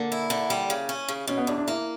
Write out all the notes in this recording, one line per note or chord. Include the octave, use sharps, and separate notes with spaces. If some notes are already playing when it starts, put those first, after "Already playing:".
Already playing: D3 A#3
E4
D3
G3
C#3
C#4
C#3
B2 C#4
B3
E2 D4
D4
A#3 E4